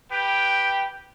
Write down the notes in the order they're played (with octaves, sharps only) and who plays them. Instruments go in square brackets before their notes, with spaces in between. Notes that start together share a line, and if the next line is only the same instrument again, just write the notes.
[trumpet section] G4 B4 G5